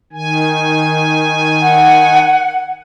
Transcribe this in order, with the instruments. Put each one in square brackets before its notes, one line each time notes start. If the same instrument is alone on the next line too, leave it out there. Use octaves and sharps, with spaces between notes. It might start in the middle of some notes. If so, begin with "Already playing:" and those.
[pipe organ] D#3 G#5
[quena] F#5